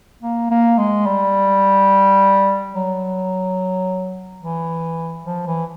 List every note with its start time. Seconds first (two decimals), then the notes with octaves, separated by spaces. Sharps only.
0.23 A#3
0.51 A#3
0.78 G#3
1.06 G3
2.74 F#3
4.42 E3
5.26 F3
5.47 E3